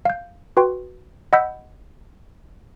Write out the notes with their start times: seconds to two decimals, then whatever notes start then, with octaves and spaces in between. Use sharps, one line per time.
0.05 F5 G6
0.57 F#4 B4 G5 C6
1.33 D#5 F#5 B5 E6 G6 B6